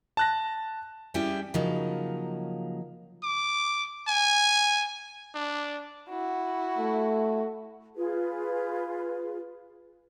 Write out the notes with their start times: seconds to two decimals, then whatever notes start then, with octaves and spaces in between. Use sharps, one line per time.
0.17 A5 F#6 A#6
1.14 G3 C#4 E4 G4 G#4
1.54 C#3 F3 F#3 A#3 D#4
3.23 D6
4.08 G#5
5.35 D4
6.10 E4 F#4
6.78 A3
7.95 F4 G#4 B4